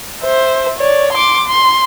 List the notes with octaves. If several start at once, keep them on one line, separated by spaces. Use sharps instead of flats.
C5 E5
C#5 D5
C6 D6
C6